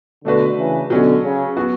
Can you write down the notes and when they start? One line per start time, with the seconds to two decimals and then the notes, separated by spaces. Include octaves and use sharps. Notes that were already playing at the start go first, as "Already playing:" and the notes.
0.25 B2 D3 A3 D4 F#4 B4
0.57 C#3 E3
0.90 B2 D3 F#3 C#4 F#4
1.23 C#3
1.57 F#3 B3 F#4